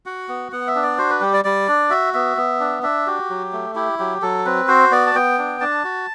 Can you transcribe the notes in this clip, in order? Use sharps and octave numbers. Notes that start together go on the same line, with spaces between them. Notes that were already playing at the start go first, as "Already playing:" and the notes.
F#4 F#5
B3
B3 F#5
E5
D4
D5
F#4 C5
B4
G3 G4
D5
G3 D5
D4
F#4 E5
B3 E5
B3
D4
D4 E5
F#4 G4
F#3
A3
E4 G4
F#3 G4
F#3 A4
C4 B4
F#4 C5
B3 D5
A5
B3 G5
D4
D4 A5
F#4